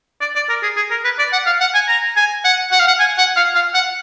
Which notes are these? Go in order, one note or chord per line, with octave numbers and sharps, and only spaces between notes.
D5
D5
A#4
G#4
G#4
A#4
B4
D5
F#5
F5
F#5
G#5
A#5
G#5
F#5
F#5
F5
F#5
G#5
F#5
F5
F5
F#5